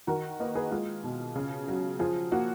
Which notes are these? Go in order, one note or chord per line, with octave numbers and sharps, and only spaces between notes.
D#3 F#4 A#4
A#3 B4 D#5
G#4 B4
G#3 F4 G#4
B2
C#3
F#3
F3 F4 G#4
A#3 F#4